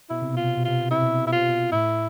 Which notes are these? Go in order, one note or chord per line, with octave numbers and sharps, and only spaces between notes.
B2 E4
C3
B2 F4
C3
B2
C3 F4
B2
C3 E4
B2
C3
B2 E4
C3 F4
B2
A2 E4